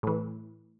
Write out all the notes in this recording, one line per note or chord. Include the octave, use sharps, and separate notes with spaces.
A2 E3